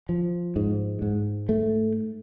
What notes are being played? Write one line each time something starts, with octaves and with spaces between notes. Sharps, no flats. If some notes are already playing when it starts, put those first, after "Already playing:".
F3
G#2
G#2
A3